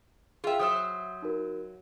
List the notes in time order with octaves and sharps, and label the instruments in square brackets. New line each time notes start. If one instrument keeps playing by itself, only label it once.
[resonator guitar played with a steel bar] F4 E5 [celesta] G#4 G5
[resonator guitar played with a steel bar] F#3 C5 E5 [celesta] D#6
[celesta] D#4 F#4 A#4